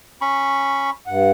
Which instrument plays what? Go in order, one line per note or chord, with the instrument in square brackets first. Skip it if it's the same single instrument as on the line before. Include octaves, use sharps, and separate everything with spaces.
[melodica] C#4 B5 C#6
[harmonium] G2 F#5